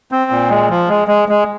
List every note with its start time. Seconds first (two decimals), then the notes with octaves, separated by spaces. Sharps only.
0.12 C4
0.31 A#2
0.50 G#3
0.70 F3
0.88 G#3
1.08 G#3
1.29 G#3